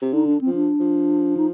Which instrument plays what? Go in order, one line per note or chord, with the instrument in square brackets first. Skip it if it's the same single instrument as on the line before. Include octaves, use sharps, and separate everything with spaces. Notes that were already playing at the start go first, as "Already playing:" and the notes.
[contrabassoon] C3
[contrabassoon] D3 [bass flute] D#4
[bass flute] D4
C4
[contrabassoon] F3
[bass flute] D4
[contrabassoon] F3
[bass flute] D#4